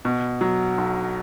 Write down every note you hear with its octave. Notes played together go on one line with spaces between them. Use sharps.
B2
F#3
B1